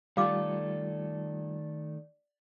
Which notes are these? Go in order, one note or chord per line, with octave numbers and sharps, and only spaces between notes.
D#3 G3 A3 F4 A4 D5 F5 D6